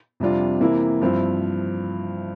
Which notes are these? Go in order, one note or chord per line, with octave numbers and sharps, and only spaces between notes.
F2 C3 G3 D4 F4
C3 E3 A#3 E4
G2 F3 C4 E4